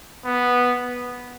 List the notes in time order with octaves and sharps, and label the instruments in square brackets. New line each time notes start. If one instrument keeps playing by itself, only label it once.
[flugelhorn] B3